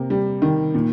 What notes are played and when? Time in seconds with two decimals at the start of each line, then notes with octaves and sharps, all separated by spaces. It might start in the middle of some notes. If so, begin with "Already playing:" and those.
Already playing: C3 A#3
0.10 G3
0.42 D#3
0.74 A#2